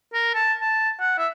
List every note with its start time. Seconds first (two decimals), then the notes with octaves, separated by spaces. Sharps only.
0.13 A#4
0.34 A5
0.61 A5
1.00 F#5
1.18 E5